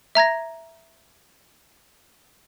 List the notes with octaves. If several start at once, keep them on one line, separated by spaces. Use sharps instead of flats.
E5 A#5 G#6 A#6